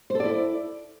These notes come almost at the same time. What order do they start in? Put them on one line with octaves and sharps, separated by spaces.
C5 A4 D5 E4